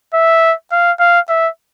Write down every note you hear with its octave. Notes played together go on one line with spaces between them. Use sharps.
E5
F5
F5
E5